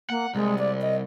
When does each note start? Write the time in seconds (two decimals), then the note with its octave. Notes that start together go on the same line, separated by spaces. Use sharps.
0.10 A#3 F#5
0.35 C2 G#3
0.58 D5
0.81 D#5